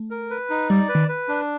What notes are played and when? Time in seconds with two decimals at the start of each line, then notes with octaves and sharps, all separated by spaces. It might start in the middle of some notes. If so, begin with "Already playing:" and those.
Already playing: A3
0.11 A#4
0.30 B4
0.50 D#4
0.69 G3 D5
0.89 B4
0.95 D#3
1.09 B4
1.29 D4